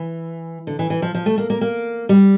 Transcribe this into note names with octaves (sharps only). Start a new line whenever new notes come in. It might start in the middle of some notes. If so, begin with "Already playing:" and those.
Already playing: E3
D3
E3
E3
F3
F3
A3
A#3
A#3
A#3
G3